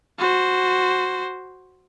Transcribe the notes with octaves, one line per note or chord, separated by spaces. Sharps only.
F#4 C5